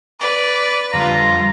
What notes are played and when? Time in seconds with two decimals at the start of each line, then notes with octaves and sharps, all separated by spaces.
0.21 B4 D5
0.93 F2 D3 G3 F4 A#5